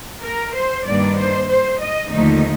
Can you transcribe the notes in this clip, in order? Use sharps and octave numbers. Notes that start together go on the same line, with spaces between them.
A#4
C5
G2 D#3 A#3 D4 D5
C5
C5
D#5
D#2 D3 F3 A3 D#4